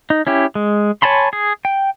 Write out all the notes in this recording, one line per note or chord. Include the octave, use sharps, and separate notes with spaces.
D#4
C#4 E4 G4
G#3
C#5 G#5 A5 B5 C6
G#4
G5